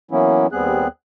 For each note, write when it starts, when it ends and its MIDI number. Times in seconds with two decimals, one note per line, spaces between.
0.11 0.47 52
0.11 0.47 54
0.11 0.47 58
0.11 0.47 59
0.11 0.47 61
0.11 0.47 64
0.52 0.88 39
0.52 0.88 55
0.52 0.88 59
0.52 0.88 60
0.52 0.88 68
0.52 0.88 90